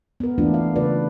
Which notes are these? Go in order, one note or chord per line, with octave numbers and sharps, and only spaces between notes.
B3 A#4
E3 A3 A#3 D4 F4
F5
C#3 A3 F4 B4 D5